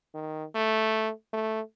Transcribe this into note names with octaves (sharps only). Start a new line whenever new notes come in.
D#3
A3
A3